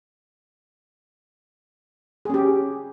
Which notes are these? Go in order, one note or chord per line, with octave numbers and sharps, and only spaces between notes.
C#4 G4 G#4